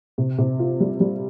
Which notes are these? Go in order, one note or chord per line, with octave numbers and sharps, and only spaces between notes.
C3
C3
F4
G3
G3